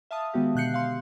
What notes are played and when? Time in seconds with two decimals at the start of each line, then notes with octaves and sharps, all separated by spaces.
0.11 E5 F5 A5 D#6
0.34 D#3 G#3 B3 F#4 G4
0.55 B2 D3 F#6 G6 C7 C#7
0.74 F5 C6